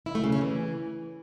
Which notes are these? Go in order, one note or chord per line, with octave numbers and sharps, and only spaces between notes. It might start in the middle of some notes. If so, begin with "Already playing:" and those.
E4
A3
C#3
C#4
E3